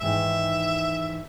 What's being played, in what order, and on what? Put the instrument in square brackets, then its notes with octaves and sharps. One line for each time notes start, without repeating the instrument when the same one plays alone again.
[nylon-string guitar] G#2 D#3 E3 [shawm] E5